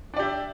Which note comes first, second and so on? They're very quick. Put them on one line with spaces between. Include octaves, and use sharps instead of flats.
D4 D5 G4 E5